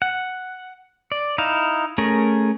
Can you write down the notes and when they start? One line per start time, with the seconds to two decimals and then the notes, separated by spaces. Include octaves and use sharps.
0.02 F#5
1.12 D5
1.38 D#4 E4 F5
1.98 A3 C#4 G#4 A#4